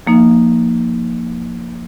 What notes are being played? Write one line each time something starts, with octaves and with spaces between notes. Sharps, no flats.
F3 A#3 D#4